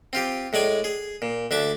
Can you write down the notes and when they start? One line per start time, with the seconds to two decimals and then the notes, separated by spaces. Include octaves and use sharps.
0.13 C4 F4 G4
0.53 A2 G#3 D5 G#5
0.84 G#4
1.22 A#2
1.51 D2 D4 E5 A5